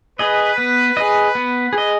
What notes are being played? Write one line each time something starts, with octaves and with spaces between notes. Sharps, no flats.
G#4 B4 D#5
B3
G#4 D#5
B3
G#4
D#5